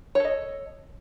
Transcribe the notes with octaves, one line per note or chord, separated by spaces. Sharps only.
A4 C#5 D#5